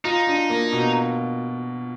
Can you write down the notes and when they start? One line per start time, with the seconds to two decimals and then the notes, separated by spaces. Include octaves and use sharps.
0.05 D#4 F4
0.27 D4
0.50 A#3
0.72 B2